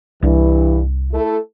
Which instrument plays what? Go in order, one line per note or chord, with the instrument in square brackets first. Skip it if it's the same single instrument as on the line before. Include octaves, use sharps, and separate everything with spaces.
[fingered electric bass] C2 D4 [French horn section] G2 E3
[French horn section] A3 E4 A4